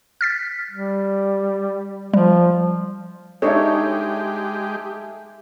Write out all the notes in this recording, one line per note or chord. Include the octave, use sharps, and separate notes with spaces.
F6 A6 B6
G3
F3 G3
G#3 D4 D#4 G4 A4 C#5 E5